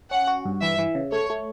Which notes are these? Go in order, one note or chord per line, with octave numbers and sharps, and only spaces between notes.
C#4 F#5
F#4
G2
E3 E5
E3
C#3
A3 C#5
A3